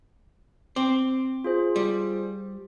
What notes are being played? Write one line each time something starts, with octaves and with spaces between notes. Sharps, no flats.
C4 D6
F4 G#4 C5
G3